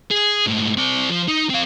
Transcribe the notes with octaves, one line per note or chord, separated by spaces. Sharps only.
G#4
G#2 A3
C4 D5
F3
D#4
C4 F5